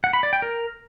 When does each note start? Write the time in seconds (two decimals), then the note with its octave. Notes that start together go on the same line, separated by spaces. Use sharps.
0.04 F#5
0.13 B5
0.23 D5
0.33 G5
0.42 A#4